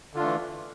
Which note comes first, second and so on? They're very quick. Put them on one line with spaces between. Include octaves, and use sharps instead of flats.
D3 F4 D4 A3 E3